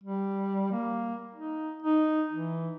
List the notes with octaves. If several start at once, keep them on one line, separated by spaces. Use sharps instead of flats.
G3
A#3
D#4
D#4
E3